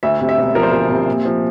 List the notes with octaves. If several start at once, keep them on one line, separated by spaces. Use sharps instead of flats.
D2 E5
C3
E5
E1
F3 A#4
C5
D2 A#4
C3
A#2
F3